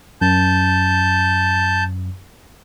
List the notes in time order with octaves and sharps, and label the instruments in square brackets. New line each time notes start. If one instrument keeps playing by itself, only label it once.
[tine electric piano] F#2 [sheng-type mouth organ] A5 G6